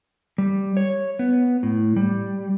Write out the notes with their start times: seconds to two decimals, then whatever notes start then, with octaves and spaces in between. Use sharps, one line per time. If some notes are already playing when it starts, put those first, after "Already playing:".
0.38 G3
0.77 C#5
1.19 B3
1.63 A2
1.96 G3